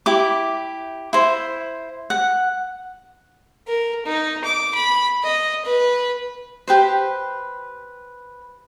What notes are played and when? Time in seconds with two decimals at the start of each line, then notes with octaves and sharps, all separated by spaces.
0.06 E4 G4 D6
1.13 E4 C5
2.10 F#5
3.68 A#4
4.06 D#4
4.44 D6
4.75 B5
5.24 D#5
5.65 B4
6.68 G4 B4 C5